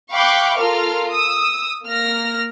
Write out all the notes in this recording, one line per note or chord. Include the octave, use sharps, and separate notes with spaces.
F5 G5 B5 C#6 D6 F#6
F4 A4 A#4 F6
D#6 E6
A#3 F6 A#6